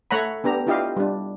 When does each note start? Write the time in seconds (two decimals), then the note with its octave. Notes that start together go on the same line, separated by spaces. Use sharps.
0.11 A3 C#5 F#5 A#5 B5
0.44 B3 D4 G4 A#5
0.66 D4 E4 F4 G4 D#5 F5
0.97 G3 D4